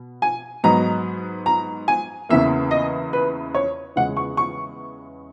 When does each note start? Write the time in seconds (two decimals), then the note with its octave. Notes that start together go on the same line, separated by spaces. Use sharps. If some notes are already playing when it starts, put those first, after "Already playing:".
Already playing: B2
0.22 G#5
0.64 G#2 F#3 B3 D#4 A#5
1.46 A#5
1.88 G#5
2.29 E2 C#3 E3 A#3 E5
2.71 D#5
3.13 B4
3.54 C#5
3.96 E2 C#3 G#3 F#5
4.17 C#6
4.37 C#6